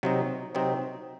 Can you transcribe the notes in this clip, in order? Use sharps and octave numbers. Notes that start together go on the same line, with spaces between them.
C3 F#3 C4 D#4
C3 F#3 C4 D#4